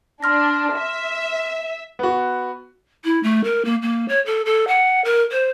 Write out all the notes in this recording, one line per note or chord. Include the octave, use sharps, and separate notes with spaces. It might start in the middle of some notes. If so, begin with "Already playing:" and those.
D4 C6 F6 A#6
E5
B3 F#4
E4
A3
A#4
A#3
A#3
C#5
A4
A4
F#5
A#4
C5